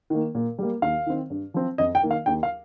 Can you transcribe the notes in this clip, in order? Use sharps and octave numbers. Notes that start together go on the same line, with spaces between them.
D#3 A#3
A#2
G3 A#3
D#2 F5
D#3 C4
G2
F3 C4
F2 D#5
G5
D#3 A#3
F5
D#2 G5
F5